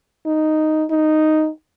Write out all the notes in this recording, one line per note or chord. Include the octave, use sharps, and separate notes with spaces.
D#4
D#4